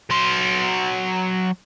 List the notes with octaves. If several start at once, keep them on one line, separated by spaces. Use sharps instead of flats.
F#3 C6